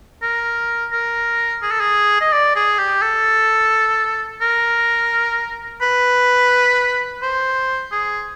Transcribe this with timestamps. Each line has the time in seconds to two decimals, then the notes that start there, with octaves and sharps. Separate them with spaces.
0.23 A#4
0.92 A#4
1.63 G#4
1.71 A4
1.81 G#4
2.21 D#5
2.33 D5
2.56 G#4
2.78 G4
3.02 A4
4.42 A#4
5.82 B4
7.22 C5
7.92 G#4